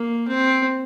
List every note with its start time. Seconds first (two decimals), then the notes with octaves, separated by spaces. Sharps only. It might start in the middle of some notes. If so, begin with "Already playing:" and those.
Already playing: A#3
0.27 C4